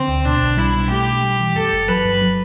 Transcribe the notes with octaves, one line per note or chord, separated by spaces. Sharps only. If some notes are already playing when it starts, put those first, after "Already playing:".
Already playing: D3 C4
D2
B2 D4
B1
G3 E4
B2
A3 G4
B2
G3
E3
F#2 A4
G1
F#3 B4
G2
F#3